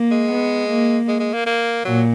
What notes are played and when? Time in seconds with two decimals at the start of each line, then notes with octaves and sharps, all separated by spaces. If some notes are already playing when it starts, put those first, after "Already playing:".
Already playing: A#3
0.12 G#3
0.30 B3
0.69 A#3
1.08 G#3
1.20 G#3
1.34 A#3
1.47 A#3
1.85 A#2 F#3